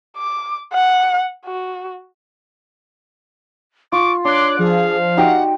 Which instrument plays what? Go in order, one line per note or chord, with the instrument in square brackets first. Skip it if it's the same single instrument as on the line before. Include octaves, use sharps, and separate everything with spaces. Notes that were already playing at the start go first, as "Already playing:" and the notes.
[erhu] D6
F#5
F#4
[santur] F4 [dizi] C#6 [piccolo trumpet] D6
[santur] D4 [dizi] C#5 [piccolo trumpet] C6 [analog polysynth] D6 F#6
[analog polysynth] F3 [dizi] G#4 [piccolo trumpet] F5
[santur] D#4 F#4 G4 [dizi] F#5